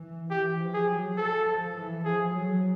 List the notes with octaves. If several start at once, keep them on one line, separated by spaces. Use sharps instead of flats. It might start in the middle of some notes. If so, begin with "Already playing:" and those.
Already playing: E3
E3 G4
F3
G#4
F#3
F3 A4
F3
E3
F3 G#4
F#3